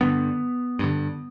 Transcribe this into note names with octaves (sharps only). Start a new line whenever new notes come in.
G2 D3 B3
G2 D3